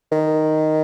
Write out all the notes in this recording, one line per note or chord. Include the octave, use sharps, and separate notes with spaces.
D#3